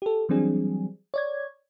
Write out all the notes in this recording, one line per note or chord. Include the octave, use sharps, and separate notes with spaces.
G4 A4
E3 F#3 G3 C4 D4 G#4
C#5 D5 G#6